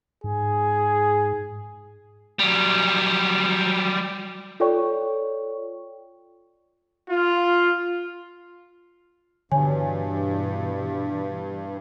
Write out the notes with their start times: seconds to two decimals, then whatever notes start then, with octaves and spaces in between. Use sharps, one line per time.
0.24 G#2 G#4
2.39 F#3 G3
4.60 F4 A4 C#5 D5 G5 C#6
7.09 F4
9.52 G2 B2 D3 E3 C#5 G#5